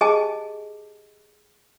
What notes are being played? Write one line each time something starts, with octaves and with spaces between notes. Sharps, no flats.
G4 G#4 D#5 G#5 A5